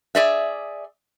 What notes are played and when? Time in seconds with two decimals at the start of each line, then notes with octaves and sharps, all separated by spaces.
0.15 G#4 D5 E5